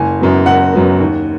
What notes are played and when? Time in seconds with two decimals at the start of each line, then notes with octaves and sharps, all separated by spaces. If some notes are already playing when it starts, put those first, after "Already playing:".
Already playing: F#1 G#5
0.20 F#2 F#3 B3
0.46 F#1 F#5
0.73 F#2 F#3 B3
1.00 D#2